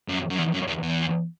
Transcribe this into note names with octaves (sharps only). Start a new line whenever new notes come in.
F#2
F#2
E2
F#2
E2
E2